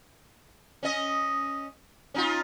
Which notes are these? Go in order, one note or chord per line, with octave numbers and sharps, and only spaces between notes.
C#4 D#5
C#4 D#4 F4